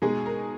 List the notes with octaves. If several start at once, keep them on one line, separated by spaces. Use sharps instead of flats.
B2 G#3 D#4 G#4
A#4